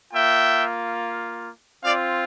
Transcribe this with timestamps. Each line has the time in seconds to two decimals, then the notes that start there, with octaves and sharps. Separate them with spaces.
0.12 A#3 F4 E5 G5
1.83 C4 F4 D5 F5